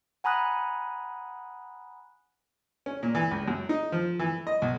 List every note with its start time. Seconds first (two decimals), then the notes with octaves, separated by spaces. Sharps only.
0.24 F#5 G#5 A#5 B5 D#6 F#6
2.86 C#4
3.03 A#2
3.15 E3
3.31 C#2
3.48 F#2
3.69 D#4
3.92 F3
4.19 E3
4.47 D#5
4.62 B1